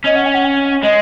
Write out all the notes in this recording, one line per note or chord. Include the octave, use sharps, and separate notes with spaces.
C#4 D#5
F#5
G#5
F#5
G#5
G#3 D#5